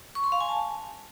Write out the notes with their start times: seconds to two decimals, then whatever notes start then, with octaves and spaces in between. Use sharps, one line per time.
0.15 C#6
0.24 C6
0.32 F5
0.40 G#5
0.49 A5